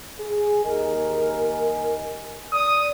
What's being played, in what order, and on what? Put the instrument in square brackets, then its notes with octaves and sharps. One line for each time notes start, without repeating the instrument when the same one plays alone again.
[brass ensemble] G#4
[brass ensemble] D#2 D#5 G#5 [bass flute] A#4
[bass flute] D5 [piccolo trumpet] D#6